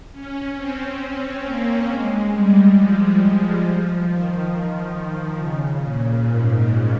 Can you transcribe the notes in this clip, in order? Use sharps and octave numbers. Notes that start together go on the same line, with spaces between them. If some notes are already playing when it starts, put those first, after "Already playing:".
C#4
C4
C4
A#3
G#3
G3
F3
G3
F3
D#3
C#3
A#2
G#2
G#2